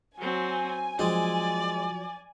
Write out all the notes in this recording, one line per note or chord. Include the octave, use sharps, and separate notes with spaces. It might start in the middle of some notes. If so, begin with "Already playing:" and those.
F#3 C4 G#5
F3 F#3 G#3 C4 D5